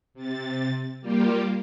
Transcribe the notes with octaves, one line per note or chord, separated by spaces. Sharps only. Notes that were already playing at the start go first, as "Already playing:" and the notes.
C3 A6
G3 A#3 F4 G4